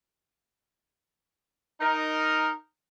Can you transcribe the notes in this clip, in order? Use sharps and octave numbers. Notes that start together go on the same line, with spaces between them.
D#4 A#4